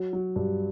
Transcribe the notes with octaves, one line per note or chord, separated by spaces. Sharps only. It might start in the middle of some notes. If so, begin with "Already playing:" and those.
Already playing: F#3
F#3
G2